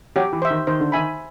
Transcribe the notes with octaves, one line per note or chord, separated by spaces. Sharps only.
F#3 G4
E3
C5 E5
D#3
D#3 C5
D3
D#3 E5 G#5 B5